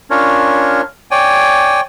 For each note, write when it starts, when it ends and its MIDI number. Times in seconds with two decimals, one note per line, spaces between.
0.10 0.81 61
0.10 0.81 62
0.10 0.81 65
0.10 0.81 70
0.10 0.81 73
1.11 1.81 73
1.11 1.81 74
1.11 1.81 79
1.11 1.81 80